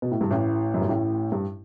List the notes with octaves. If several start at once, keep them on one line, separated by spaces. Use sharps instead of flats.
B2
A2
G2
A1 A2
F#2
G2
A1 A2
G2